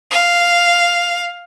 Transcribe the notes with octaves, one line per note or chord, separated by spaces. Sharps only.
F5